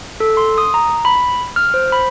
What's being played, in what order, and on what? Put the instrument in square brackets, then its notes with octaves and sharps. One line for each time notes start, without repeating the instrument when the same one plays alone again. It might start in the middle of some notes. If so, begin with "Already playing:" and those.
[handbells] A4
C6
D#6
A#5
B5
F6
C5
B5